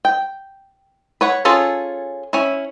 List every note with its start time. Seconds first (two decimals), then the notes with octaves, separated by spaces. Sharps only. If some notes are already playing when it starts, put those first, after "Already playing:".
0.05 G5
1.21 B4 C#5 F#5
1.45 C#4 F4 G#4 A4
2.33 C#4 E4